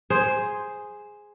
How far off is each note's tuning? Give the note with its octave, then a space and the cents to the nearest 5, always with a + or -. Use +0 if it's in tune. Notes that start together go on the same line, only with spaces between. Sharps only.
G#4 +0 C5 +0